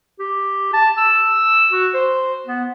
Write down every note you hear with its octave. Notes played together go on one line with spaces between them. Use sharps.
G4
A5
E6
F#4
C5
B3